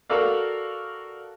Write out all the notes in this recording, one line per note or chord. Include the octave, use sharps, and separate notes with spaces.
F#4 A4 A#4 D5 F5